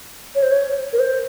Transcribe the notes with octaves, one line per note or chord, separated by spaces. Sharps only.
C#5
C5
C#5
A#4
C5